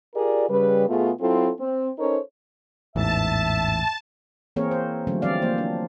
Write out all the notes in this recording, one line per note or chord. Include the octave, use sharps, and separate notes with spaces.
F4 G4 G#4 A#4 D5
C#3 G3 B4
B2 A3 B3 F4 G#4
F#3 C4 E4 F4 A4
C4
C#4 D#4 A4 A#4 C5 C#5
A1 E2 G#2 E3 E5 A5
E3 A#3 C4 G#4 A#4 C#5
C5
D3 F3 F#3 A3 C#4
E3 G3 C4 D5 F5
F3 A#3 C5
D4